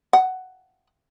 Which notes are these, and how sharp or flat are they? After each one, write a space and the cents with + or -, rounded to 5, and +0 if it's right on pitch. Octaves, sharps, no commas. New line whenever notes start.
F#5 +10